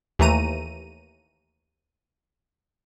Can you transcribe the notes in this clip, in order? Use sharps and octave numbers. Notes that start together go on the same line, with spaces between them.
D#2 E3 A3 A#5 D#7